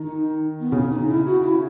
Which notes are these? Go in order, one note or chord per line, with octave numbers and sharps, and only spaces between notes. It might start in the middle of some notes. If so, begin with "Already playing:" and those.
Already playing: D#3 D#4
B3
C#3 C#4
D#4
E4
F#4
E4